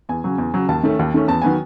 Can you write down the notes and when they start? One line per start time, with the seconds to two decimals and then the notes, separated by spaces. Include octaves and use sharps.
0.09 E2 G#5
0.24 C#3 F#3
0.38 E2
0.54 C#3 F#3
0.69 D#2 A5
0.83 D#3 A3 C#4
0.99 D#2
1.14 D#3 A3 C#4
1.28 E2 A5
1.42 D#3 F#3 B3 G#5